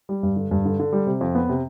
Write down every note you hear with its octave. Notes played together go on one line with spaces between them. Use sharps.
G3
G2
D3
G2
D3
D3
G3
C3
F2
B3
C3